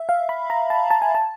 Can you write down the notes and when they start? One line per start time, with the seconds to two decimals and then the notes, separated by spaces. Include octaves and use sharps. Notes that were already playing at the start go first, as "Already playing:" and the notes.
Already playing: E5
0.09 F5
0.29 B5
0.50 A#5
0.70 A5
0.90 A5
1.02 G#5
1.15 A5